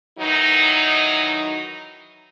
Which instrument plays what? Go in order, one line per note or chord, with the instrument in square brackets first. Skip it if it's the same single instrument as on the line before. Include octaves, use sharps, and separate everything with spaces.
[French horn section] D#3 E3 F#3 D#4